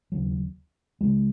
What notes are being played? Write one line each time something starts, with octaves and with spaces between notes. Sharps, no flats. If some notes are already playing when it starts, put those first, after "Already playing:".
E1 D#2 C#3 F#3
C#2 C#3 G#3